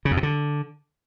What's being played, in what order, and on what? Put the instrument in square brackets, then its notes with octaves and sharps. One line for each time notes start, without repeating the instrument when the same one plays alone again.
[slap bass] C#3
F2
B2
D3